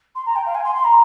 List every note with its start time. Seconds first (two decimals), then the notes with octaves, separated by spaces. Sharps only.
0.15 C6
0.26 A#5
0.36 G5
0.46 F5
0.55 G#5
0.64 C6
0.75 C6
0.84 A#5